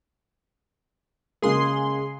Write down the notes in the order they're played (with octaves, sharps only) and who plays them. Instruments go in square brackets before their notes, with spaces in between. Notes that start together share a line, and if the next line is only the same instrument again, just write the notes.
[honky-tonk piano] C#3 G#3 A#3 [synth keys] G#4 C6